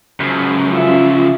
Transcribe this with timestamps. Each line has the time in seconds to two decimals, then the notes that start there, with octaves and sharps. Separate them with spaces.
0.20 F#2 C#3 F3
0.72 F4 E5